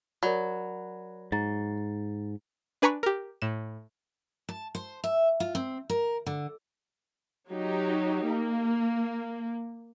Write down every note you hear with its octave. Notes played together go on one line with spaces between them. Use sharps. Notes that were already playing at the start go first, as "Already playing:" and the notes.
F#3 A#4 D5 B5
G#2 A#5 A6
D4 B4 G#5 A#5 B5 C#6
G4 A#4
A2 E7
A5
C5
E5
F4
C4
A#4
D3
F#3 D#4 G4
A#3